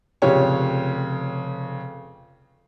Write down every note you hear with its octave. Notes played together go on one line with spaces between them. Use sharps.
F1 F2 C#3 G4 C#5